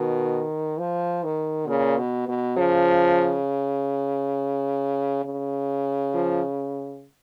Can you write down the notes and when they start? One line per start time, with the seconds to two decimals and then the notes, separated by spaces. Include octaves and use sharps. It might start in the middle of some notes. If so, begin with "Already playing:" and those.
Already playing: B2 D#3
0.79 F3
1.24 D#3
1.68 A#2 C#3
1.98 B2
2.28 B2
2.57 C#3 F3
5.25 C#3
6.14 F3